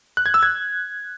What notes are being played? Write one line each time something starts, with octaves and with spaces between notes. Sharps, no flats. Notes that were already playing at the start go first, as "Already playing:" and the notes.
F#6
G#6
E6
G#6